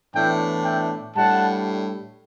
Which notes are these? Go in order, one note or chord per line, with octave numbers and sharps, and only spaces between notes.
A2 E3 B3 D4 E5 G5
E5 G5
A2 G3 D4 F#5 A5